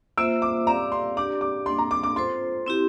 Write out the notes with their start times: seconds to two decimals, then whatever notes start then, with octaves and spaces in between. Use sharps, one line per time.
0.17 A#3 F4 C5 E5 E6
0.42 D6
0.67 C4 G4 D5 F5 A#5
0.92 C6
1.17 D4 G4 D5 D6
1.41 D6
1.66 A#3 D4 A4 C6
1.78 A#5
1.91 D6
2.03 D6
2.16 F4 A4 C5 C6
2.66 C4 E4 G4